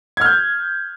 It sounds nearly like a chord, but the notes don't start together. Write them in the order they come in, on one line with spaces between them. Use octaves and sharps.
G#6 F6 G6